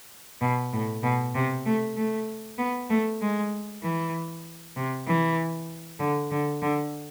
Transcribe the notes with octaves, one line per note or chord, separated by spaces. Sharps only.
B2
A2
B2
C3
A3
A3
B3
A3
G#3
E3
C3
E3
D3
D3
D3